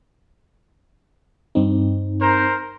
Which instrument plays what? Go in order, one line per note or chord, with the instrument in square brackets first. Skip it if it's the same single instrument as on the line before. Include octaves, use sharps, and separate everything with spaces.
[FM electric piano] G2 C4 D#4
[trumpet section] A#4 C5